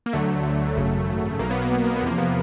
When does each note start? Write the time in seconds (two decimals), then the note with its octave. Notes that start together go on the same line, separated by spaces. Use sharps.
0.06 A#3
0.13 D2 D3 F#3 A3
0.76 G#1 F#2 C#3 F#3
1.39 B1 B2 F#3 A#3
1.51 B3
1.62 A#3
1.73 B3
1.84 A#3
1.96 B3
2.03 E2 C3 F3 A#3
2.18 B3